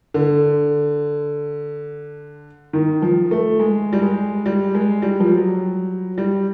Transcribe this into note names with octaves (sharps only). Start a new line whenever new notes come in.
D3
D#3
F3
A3
G#3
G3
G#3
G3
G#3
G3
F3
F#3
G3